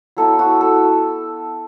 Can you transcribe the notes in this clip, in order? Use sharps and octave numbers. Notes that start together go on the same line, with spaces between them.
F#3 B3 E4 A4
F#4
A4